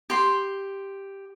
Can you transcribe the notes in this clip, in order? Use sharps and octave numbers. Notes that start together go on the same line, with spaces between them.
G4 C6